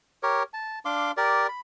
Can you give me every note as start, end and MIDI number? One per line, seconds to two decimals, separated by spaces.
0.23 0.43 67
0.23 0.43 70
0.23 0.43 73
0.54 0.79 81
0.85 1.12 62
0.85 1.12 77
0.85 1.12 84
0.85 1.12 86
1.17 1.47 67
1.17 1.47 70
1.17 1.47 74
1.49 1.61 83